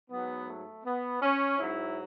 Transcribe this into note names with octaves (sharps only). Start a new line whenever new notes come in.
G#2 F#3 B3
A3
B3
C#4
G#2 F#3 E4